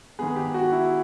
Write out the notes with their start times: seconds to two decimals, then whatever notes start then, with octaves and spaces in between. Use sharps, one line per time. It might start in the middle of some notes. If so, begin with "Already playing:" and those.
0.19 D#3 G#3 B3 G#4
0.36 G4
0.54 F#4
0.72 E4